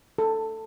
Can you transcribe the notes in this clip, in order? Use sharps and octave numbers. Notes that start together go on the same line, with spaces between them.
A4